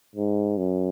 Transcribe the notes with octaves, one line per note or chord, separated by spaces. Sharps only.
G#2
F#2